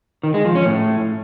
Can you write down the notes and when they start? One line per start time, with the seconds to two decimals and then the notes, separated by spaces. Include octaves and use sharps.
0.23 D#3
0.34 G#3
0.45 F3
0.55 C#4
0.66 A2